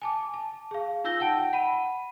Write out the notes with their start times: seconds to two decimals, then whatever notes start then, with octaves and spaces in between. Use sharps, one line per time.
0.02 G#5 A5 D6
0.34 A5
0.71 G#4 F5
1.04 D#4 F4 E6 G6 A#6 G7
1.20 F#5 G5 A5 D7
1.53 F#5 B5 D#7